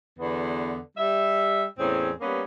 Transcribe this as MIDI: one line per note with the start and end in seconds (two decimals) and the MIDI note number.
0.19 0.78 40
0.19 0.78 50
0.19 0.78 59
0.97 1.63 55
0.97 1.63 76
1.78 2.11 40
1.78 2.11 45
1.78 2.11 60
1.78 2.11 61
1.78 2.11 68
2.21 2.42 55
2.21 2.42 58
2.21 2.42 59
2.21 2.42 61
2.21 2.42 71